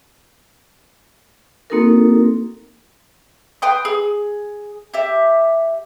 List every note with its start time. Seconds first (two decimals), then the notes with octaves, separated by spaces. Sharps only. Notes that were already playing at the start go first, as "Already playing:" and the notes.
1.70 A#3 C4 D#4 F#4 A4 A#4
3.62 B4 G5 C6 D#6
3.85 G#4
4.94 G4 E5